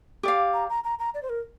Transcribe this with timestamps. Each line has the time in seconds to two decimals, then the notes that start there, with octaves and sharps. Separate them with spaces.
0.23 G4 D5 F5
0.54 A#5
0.70 A#5
0.84 A#5
0.99 A#5
1.14 D5
1.23 C5
1.30 A#4